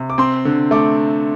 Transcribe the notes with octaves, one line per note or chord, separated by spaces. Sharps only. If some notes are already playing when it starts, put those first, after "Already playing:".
Already playing: C3
D6
C4 C6
D3
A3 D6